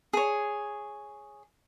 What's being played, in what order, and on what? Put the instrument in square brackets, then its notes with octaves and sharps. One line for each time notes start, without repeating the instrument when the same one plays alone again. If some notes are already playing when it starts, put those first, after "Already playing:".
[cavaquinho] G#4 C#5